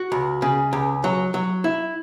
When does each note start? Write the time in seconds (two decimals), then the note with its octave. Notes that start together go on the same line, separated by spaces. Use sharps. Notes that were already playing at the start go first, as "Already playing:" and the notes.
Already playing: F#4
0.12 C#2
0.42 C#3
0.73 C#2
1.04 F#3
1.34 F#3
1.64 E4